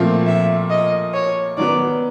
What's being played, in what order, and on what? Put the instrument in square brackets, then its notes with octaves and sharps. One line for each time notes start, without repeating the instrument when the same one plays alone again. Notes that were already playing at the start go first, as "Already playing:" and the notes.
Already playing: [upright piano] A#2 F3 A3 C4 F4
[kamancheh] E5
D#5
C#5
[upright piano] D#3 F#3 B3 [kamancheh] D5